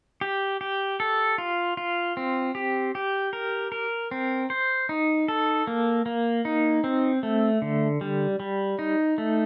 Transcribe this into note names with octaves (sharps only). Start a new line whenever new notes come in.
G4
G4
A4
F4
F4
C4
G4
G4
A#4
A#4
C4
C5
D#4
A4
A#3
A#3
D#4
C4
A3
D3
G3
G3
D#4
A3